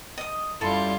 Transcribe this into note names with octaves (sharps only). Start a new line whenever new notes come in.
D#5 D#6
F#2 G3 E4 F4 A4 C6